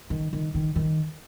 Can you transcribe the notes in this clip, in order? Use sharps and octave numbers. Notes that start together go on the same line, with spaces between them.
D#3
D#3
D#3
D#3